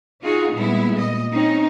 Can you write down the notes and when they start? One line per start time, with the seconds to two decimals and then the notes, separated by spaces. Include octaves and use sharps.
0.23 D#4 F4 F#4 G#4
0.52 A#2 G3 G#3 B3 E4
0.94 A#2 D#5
1.31 C4 C#4 D#4